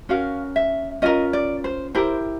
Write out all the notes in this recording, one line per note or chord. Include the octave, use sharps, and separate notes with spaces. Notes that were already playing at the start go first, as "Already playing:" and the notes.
C#4 F#4 A#4 F5
E5
C#4 F4 A#4 D#5
D5
C5
E4 G4 A#4 C5